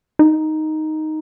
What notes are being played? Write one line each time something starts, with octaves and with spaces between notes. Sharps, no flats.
D#4